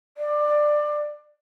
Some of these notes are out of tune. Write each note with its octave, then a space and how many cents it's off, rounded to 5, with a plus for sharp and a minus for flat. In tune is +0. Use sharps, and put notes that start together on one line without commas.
D5 +20